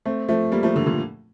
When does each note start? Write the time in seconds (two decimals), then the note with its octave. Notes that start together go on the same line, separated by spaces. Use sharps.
0.05 A3 C4
0.29 F3 A3
0.52 G3 A#3
0.63 F3 A3
0.75 D3 F3
0.86 A#2 D3